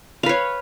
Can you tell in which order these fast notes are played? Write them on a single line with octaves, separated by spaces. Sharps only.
F5 B4 C#5